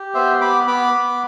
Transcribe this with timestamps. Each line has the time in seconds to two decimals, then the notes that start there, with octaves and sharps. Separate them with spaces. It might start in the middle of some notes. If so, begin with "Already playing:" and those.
Already playing: G4
0.14 B3 C5 E5
0.41 B3 B5 D6
0.67 B3 B5 D6
0.93 B3